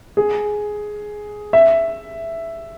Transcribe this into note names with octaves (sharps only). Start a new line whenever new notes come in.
G#4
E5